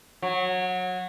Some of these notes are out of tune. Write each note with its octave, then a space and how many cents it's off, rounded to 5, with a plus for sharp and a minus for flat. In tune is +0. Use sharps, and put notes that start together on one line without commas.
F#3 -20